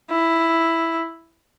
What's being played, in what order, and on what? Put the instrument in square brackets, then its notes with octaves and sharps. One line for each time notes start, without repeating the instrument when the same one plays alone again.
[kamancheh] E4